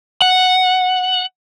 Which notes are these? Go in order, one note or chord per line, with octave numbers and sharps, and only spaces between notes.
F#5